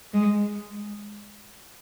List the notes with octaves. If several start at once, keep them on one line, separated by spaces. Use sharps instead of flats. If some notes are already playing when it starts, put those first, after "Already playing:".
G#3